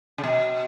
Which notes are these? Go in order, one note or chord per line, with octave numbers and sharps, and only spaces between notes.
C#3
B2